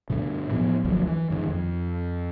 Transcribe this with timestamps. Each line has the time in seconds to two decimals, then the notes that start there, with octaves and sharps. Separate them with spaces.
0.10 D2 G2 B2
0.51 A2 F3 B3
0.85 G1 D2 F3 F#3
1.07 E3
1.30 G2 D3 D#3
1.48 F2